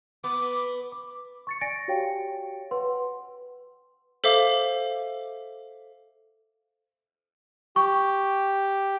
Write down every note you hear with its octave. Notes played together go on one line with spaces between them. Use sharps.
B3 D6
D6
C#6 A6 C#7
D5 G#5 A6 A#6 C#7 D7
F#4 G4 C#5 F5 G5
B4 F#5 C6
A4 C5 E5 F5 D6
G4 C#6